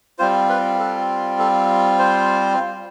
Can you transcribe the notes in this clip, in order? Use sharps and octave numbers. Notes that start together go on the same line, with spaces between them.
G3 C4 F4 C5
B4
A4
A4
C5